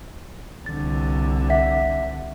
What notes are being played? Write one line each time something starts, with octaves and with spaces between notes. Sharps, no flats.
C2 D3 A6
E5 F#5 B6